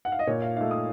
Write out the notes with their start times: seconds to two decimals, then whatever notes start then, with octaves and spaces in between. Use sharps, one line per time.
0.05 F#5
0.12 F5
0.19 D#5
0.27 A#2 C#5
0.42 F5
0.57 A3 D#4 F5
0.71 D#6